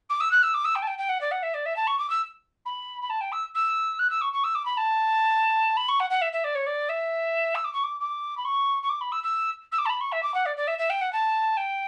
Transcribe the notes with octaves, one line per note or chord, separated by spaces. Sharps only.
D6
E6
F#6
E6
D6
E6
G5
A5
G5
G5
F#5
D5
F#5
E5
D5
E5
A5
C#6
D6
E6
B5
B5
A5
G5
E6
E6
F#6
E6
C#6
C#6
E6
D6
B5
A5
B5
C#6
F#5
F#5
E5
E5
D5
C#5
D5
E5
E6
D6
C#6
D6
D6
B5
C#6
C#6
D6
B5
E6
E6
E6
D6
A5
B5
C#6
E5
D6
F#5
D5
D5
E5
E5
G5
F#5
A5
G5